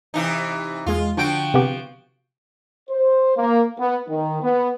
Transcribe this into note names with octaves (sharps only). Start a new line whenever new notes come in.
C3 E3 D#4
E2 G#3 F4
D3 F3 F#4 G5 D7
C3 B3 G4
C5
A#3
B3
D#3
B3